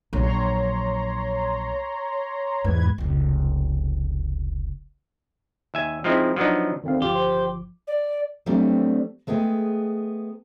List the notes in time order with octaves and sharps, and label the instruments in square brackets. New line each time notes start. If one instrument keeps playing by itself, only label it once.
[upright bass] A#1 F#3 [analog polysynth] C#5 A#5 C6
[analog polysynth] E2 B4 G#6 [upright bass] G#2
[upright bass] F1 C#2
[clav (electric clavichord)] D#2 E5 G#5
F3 G#3 C4 D#4 E4
F3 F#3 B3 D4 D#4
[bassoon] D2 [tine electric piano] D#3 C4 F5
[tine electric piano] G1 F3 D6 [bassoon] F4 [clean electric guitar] G4
[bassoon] C5
[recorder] D5
[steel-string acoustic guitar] F#3 G3 A3 B3 C4 D4
G#3 A3 B3 G#4 G5